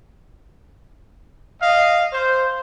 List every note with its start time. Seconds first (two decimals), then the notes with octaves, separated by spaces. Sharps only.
1.60 D#5 F5
2.12 C5